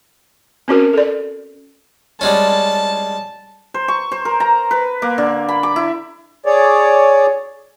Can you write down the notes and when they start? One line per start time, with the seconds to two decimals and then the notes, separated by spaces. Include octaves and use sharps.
0.68 C4 C#4 F#4 A#4
0.93 A4 D5
2.21 G3 G#3 C#4 A5
3.74 C5
3.88 C#6
4.12 C5
4.25 A#4
4.40 A#5
4.71 B4
5.02 A#3
5.18 D3
5.49 B5
5.63 D6
5.76 E4
6.46 G#4 C#5 D5